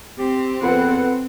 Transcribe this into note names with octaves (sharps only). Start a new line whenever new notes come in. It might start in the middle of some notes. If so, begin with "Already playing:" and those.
C4 G4
E2 F3 A4 B4 F#5